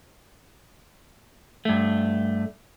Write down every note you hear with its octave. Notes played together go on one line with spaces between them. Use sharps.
G2 A3